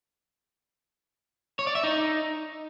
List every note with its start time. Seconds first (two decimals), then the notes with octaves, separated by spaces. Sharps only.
1.59 C#5
1.67 D5
1.75 E5
1.84 D#4